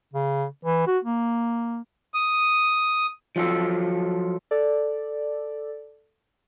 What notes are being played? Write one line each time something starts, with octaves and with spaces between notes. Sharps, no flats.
C#3
E3
F#4
A#3
D#6
F3 F#3 F4 A4
A4 D5